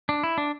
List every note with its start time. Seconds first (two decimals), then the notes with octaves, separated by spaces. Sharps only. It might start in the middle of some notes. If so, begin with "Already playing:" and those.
0.09 D4
0.23 E4
0.38 D4